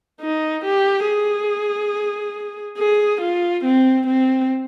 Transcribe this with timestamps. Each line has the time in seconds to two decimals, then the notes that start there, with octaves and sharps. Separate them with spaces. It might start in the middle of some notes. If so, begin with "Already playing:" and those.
0.21 D#4
0.65 G4
1.07 G#4
2.78 G#4
3.21 F4
3.65 C4
4.07 C4